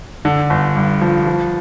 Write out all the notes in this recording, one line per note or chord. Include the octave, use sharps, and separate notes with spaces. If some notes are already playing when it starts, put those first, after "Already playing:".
D3
G1
G2
F3
F3